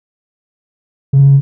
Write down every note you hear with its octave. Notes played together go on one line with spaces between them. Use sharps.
C#3